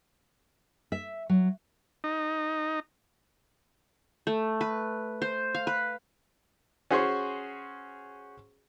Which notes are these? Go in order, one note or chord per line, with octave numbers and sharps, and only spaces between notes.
E5
F#3
D#4
A3
B4
C5
F5
B4
C#4 F#4 G#4 C5 C6 C#6